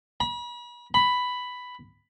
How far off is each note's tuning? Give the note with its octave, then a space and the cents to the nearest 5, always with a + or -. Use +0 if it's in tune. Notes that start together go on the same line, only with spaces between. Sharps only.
B5 -40
B5 +5